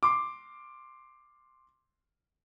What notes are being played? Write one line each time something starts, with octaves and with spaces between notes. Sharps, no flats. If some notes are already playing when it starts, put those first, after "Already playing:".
C6 D6